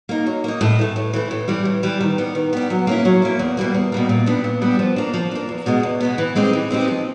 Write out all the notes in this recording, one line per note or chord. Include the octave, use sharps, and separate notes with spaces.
A#3 D#4
F#3
A#3 D#4
A2
E3 A3
A2
E3 A3
A2
E3 G3
A2
E3 G3
D#3
G3 B3
D#3
G3 B3
F#3
A#3 C#4 E4
F#3
A#3 C#4 E4
E2
B2 G3 A#3
E2
B2 G3 A#3
A#2
G3 B3 D4
A#2
G3 B3 D4
F3
A#3 D4
F3
A#3 D4
E2
B2 G#3 B3
E2
B2 G#3 B3
E3
G#3 C4 D#4 G4
E3
G#3 C4 D#4 G4
F3